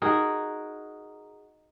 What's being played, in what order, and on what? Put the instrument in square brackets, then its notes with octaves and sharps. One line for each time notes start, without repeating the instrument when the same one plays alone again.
[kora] D#4 F#4 G#4 A#4